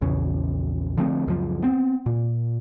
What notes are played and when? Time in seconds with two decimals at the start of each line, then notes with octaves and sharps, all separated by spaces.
0.01 A#1 E2 C#3
0.98 D3 F3 A3 C4
1.26 C#2 F#2 F3
1.63 B3 C4
2.06 A#2